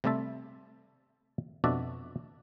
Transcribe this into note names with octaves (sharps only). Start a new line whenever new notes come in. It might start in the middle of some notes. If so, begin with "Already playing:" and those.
C3 G3 A3 C4 E5 A5
F2 B2 D4 F#4 D5 E5